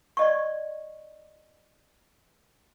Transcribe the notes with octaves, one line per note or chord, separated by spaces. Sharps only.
D5 D#5 C#6